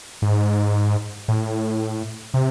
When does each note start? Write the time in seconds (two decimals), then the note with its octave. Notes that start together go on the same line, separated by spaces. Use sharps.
0.22 G#2
1.28 A2
2.34 C3